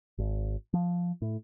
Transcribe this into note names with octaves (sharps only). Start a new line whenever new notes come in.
G#1
F3
A2